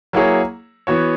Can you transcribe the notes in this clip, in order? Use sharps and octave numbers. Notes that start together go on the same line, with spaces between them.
F#3 A#3 E4 G#4 C#5
E3 B3 F#4 C#5